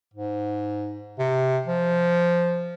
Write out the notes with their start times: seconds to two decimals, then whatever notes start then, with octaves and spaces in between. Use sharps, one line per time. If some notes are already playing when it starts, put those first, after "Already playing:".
0.14 G#2
1.19 C3
1.66 F3